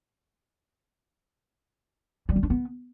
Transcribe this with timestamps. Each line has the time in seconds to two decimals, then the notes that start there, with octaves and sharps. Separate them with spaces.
2.29 G3
2.36 C#4
2.43 D4
2.50 B3